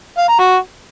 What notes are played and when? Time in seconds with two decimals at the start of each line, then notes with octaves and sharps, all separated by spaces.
0.18 F5
0.29 A#5
0.39 F#4